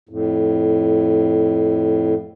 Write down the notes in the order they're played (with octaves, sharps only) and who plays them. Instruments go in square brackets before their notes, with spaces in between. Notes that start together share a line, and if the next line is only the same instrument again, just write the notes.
[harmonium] F2 A2